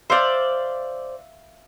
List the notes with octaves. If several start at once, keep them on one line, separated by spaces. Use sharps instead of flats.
C5 D5 E5 F5